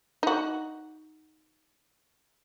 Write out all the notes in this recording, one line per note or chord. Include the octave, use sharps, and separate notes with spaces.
D#4 F#4